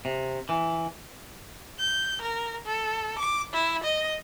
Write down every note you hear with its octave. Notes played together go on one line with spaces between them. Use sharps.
C3
E3
G6
A#4
A4
D6
E4
D#5